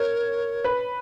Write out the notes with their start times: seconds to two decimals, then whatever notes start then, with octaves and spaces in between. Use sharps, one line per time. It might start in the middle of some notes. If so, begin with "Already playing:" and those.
Already playing: A#4 C#5
0.64 B4